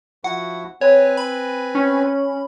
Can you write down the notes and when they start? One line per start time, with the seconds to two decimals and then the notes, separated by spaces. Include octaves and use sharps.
0.24 F3 E4 F#4 F#5
0.81 C4 B4 C#5 G#5
1.17 B5
1.75 C#4